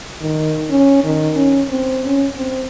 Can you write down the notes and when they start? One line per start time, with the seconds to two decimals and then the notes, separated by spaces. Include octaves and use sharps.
0.21 D#3
0.70 C#4
1.04 D#3
1.36 C#4
1.70 C4
2.05 C#4
2.37 C4